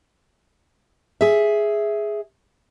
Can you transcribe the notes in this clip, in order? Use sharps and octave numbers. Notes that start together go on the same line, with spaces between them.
G#4 E5